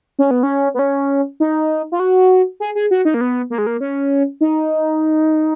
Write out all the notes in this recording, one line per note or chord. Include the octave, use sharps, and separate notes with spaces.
C#4
B3
C#4
B3
C#4
D#4
F4
F#4
G#4
G#4
F#4
D#4
A#3
B3
A#3
G#3
A#3
C#4
D#4